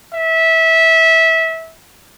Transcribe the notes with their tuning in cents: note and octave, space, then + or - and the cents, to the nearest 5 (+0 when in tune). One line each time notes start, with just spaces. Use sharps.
E5 -20